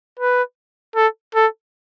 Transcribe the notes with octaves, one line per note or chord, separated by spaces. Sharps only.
B4
A4
A4